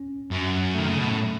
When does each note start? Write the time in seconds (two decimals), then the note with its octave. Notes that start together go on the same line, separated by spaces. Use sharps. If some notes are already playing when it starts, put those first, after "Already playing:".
Already playing: C#4
0.31 F#2
0.75 D#3 A3
0.88 C#3
0.98 B2
1.08 A2